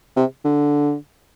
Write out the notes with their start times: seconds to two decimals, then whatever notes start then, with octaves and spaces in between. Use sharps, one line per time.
0.16 C3
0.44 D3